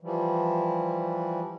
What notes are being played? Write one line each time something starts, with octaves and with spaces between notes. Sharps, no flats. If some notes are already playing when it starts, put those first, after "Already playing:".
E3 F3 G3